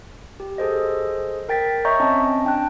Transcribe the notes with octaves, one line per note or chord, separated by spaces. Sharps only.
G4
G#4 A4 C5 D#5
A#4 G5 A6 B6
C#5 D#5 E5 A#5 C#6 G6
C4 C#4 D#5 A5
D4 G5 A5 F#6